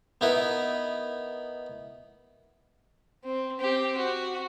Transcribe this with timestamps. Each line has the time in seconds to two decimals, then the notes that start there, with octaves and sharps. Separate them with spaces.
0.21 B3 D#4 E4 A#4 B4 E5
3.24 C4
3.60 C4 G4
3.98 F#4